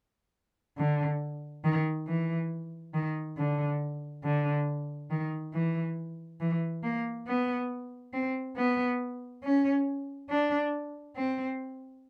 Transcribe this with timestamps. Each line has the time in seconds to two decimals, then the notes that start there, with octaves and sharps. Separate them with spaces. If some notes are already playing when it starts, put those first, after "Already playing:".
0.77 D3
1.64 D#3
2.07 E3
2.94 D#3
3.37 D3
4.23 D3
5.10 D#3
5.53 E3
6.40 E3
6.83 A#3
7.27 B3
8.13 C4
8.56 B3
9.43 C#4
10.29 D4
11.16 C4